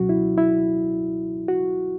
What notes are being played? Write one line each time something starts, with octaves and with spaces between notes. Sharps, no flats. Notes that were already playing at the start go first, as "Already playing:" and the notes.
Already playing: C#2 B2 F#3 C#4 F#4
E4
E4
F#4